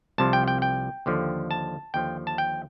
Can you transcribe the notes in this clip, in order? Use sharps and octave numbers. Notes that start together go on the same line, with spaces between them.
C2 C3 F3 A5
G5
G5
G5
D#2 D3 F3
A5
D#2 D3 F3 G5
A5
G5